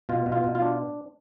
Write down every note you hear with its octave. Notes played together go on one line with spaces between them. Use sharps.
B2 F4
B2
F4
B2
F4
D4